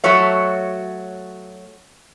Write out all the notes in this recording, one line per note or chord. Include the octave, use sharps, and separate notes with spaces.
F#3 A3 F#4 C#5 E5